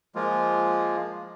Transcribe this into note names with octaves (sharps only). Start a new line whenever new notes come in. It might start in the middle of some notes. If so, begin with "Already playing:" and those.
F3 G#3 A#3 F4